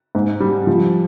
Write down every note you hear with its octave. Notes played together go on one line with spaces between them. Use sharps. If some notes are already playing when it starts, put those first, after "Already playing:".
G#2
G3
F3